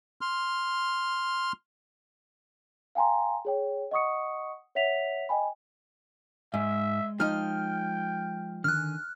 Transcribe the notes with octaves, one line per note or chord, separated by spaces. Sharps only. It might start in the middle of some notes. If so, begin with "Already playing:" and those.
C6 F6
F5 G5 G#5 A#5 C6
G#4 C#5 G5
D#5 F#5 C#6 D#6 C#7
C#5 E5 F#5 B6 F7
D#5 G5 G#5 B5
G#2 G#3 D#5 E5
F3 D#4 G5 F6
D3 D#3 G#5 F6 F#6